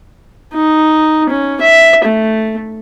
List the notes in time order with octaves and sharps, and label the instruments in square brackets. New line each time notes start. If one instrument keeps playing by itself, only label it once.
[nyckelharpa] D#4
C#4
E5
A3